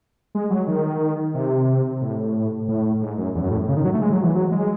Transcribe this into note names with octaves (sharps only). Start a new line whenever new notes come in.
G#3
F#3
D#3
C3
A2
A2
G#2
F#2
E2
F#2
A2
C#3
D#3
F#3
A3
G#3
F#3
E3
F#3
G#3